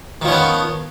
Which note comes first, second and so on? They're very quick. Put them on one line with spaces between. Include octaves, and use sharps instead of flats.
D#3 F3 C#4 B3